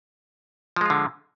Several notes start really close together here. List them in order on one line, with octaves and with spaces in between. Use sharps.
F3 G#3 F4 D3